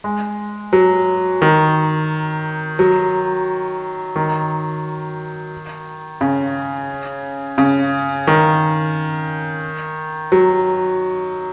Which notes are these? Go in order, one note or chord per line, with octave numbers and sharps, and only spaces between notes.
G#3
F#3
D#3
F#3
D#3
C#3
C#3
D#3
F#3